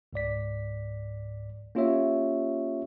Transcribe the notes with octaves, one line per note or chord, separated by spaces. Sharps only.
C#2 G#2 D5 B6
A#3 C#4 F4 G4 C#5 E5